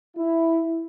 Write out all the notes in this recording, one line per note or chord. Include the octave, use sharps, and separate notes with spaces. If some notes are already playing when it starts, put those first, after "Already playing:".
E4